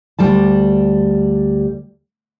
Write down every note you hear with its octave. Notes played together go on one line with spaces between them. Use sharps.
D2 G3 D5 A5